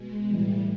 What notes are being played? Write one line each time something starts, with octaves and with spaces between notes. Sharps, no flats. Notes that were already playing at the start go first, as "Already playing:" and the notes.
Already playing: B2 G#3
A2 E3 G3